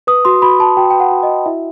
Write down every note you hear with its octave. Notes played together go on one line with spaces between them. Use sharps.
B4 D#6
F#4 C6
F#4 B5
F#4 A5
F#4 G5
B4 G5
F#5
F#4
D#5
F#4
E4 E5